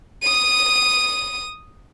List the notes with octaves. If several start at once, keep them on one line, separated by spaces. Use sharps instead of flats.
D#6 D#7